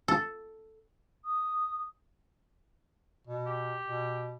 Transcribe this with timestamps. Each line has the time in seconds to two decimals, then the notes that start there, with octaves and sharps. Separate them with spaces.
0.08 A4
1.25 D#6
3.27 B2
3.46 G4
3.85 B2